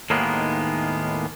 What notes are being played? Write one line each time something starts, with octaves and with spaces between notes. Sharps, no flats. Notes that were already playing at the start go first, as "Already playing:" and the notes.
D#2 A2 D#3 G#3 A#3 B3